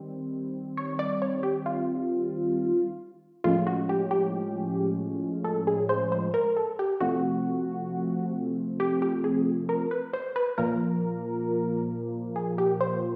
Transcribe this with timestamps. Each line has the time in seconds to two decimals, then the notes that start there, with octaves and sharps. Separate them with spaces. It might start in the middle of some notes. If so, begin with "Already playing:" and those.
Already playing: D#3 G3 C4
0.77 C#5
0.99 D5
1.22 C#5
1.43 G4
1.66 F4
3.44 A2 F3 G#3 C#4 F4
3.67 F#4
3.89 G4
4.11 G4
5.44 A4
5.67 G#4
5.89 C5
6.12 C5
6.34 A#4
6.57 A4
6.79 G4
7.01 C3 F3 A3 C4 F#4
8.80 G4
9.02 G4
9.24 G#4
9.69 A#4
9.91 B4
10.13 C5
10.36 B4
10.58 A#2 F3 A#3 A#4
12.36 G#4
12.58 G4
12.81 C5